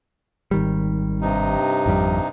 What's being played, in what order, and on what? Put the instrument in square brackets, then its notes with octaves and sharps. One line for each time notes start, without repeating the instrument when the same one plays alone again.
[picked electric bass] G#1 D#3 G3
[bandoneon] G2 C3 D#4
[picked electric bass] G#1 F2 G3